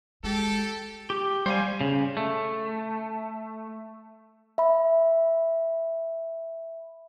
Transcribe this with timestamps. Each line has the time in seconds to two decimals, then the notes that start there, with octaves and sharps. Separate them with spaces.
0.24 G#3 G4 A4
1.10 G4
1.46 G3 C5 F5 G#5
1.81 C#3
2.17 A3
4.58 E5 B5